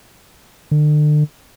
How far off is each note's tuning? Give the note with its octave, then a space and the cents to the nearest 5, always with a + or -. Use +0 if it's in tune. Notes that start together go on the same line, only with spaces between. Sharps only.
D3 +35